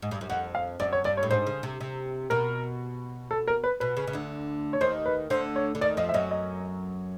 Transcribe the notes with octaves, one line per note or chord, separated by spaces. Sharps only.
G#2
G2
F#2
F2 F#5
F5
F#2 D5
C#5
G2 D5
C#5
A2
G#2 C5
C#3
C3
C3
B2 A#4
A4
A#4
B4
B2 B4
C#3
C#3
D2 D3
C#5
D#2 D#3 C5
B4
D2 D3 C5
C#5
D3
D#2 D#3 D5
F2 F3 D#5
E5
F#2 F#3 D#5
D#5